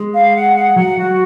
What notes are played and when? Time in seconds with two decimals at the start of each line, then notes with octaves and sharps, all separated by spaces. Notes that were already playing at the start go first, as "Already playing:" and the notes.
Already playing: G#3
0.13 F5
0.35 F#5
0.56 F#5
0.76 F#3 F#5
0.97 F#4